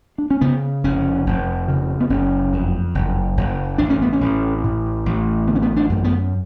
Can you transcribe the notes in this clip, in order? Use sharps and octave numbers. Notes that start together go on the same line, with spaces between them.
D4
C#4
C#3 B3
F1 C#4
F1
C#3
B3
F#1 C#4
F2
F#1
F#1
A1 D4
C#4
B3
C#4
A1
A2
A1
D3 B3
C#4
B3
D4
F#2
B3